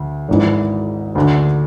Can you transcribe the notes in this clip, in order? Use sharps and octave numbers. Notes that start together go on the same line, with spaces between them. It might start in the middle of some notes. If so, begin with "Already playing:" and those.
Already playing: D2
G#1 G#2 E3
D2 D3